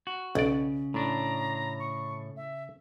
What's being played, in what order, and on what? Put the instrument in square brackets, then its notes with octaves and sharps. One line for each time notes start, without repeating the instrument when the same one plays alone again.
[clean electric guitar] F#4
[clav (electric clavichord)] B1 D5 [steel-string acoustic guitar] C#3
[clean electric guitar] A2 D4 [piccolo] A#5
[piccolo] C#6
E5